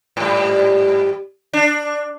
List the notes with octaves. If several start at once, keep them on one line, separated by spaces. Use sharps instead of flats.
G#2 G3
D4